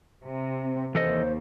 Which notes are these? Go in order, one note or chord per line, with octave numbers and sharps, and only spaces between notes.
C3
C4
D#2 E3 A4 C5 D#5